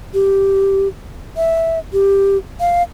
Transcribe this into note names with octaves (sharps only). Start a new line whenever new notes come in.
G4
E5
G4
F5